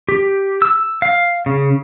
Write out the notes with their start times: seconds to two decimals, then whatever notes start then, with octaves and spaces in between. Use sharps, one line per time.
0.09 G4
0.62 E6
1.02 F5
1.46 C#3